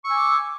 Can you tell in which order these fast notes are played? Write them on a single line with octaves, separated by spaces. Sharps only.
C#6 E6 G#5 D6